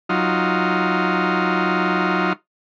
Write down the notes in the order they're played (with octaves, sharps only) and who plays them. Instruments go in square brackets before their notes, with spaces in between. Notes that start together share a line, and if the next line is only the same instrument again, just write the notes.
[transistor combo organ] F#3 D#4 F4